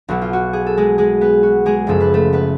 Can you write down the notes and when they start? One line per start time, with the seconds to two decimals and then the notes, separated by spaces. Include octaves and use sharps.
0.09 B1 B2 F#3 F#4
0.22 F4
0.33 F#4
0.53 G#4
0.66 A4
0.77 G#3 G#4
0.98 G#3 G#4
1.21 B3 B4
1.43 F#4
1.66 G#3 G#4
1.87 F#1 F#2 C#3 F3 A4
2.01 B4
2.14 A3 A4
2.33 B3 B4